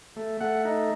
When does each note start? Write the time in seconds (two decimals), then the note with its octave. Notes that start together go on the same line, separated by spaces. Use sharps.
0.16 A3
0.40 A3 F#5
0.65 D#4